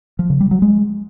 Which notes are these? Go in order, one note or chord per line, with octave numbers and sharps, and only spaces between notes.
F3
C#3
G3
F#3
G#3